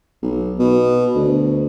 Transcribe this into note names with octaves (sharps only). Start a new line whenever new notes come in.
B1
B2
D2